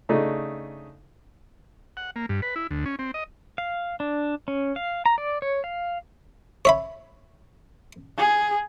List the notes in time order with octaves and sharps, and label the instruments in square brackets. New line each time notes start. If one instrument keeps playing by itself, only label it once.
[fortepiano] C#3 A3 D4 D#4
[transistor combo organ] F#5
A#3
G2
B4
E4
D2
C#4
C4
D#5
[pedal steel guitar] F5
D4
C#4
F5
A#5
D5
C#5
F5
[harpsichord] C#5 E5 B5
[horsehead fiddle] G#4